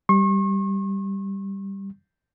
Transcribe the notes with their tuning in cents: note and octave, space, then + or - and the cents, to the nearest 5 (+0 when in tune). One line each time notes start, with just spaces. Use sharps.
G3 +0 C#6 -40